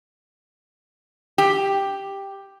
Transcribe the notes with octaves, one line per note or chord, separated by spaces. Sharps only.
G4